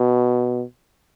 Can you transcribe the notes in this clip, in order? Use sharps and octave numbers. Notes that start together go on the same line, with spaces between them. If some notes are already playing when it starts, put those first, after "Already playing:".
Already playing: B2